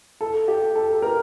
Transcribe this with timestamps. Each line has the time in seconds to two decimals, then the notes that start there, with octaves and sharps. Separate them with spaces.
0.21 A4
0.48 G4
0.75 A4
0.93 A4
1.02 A#4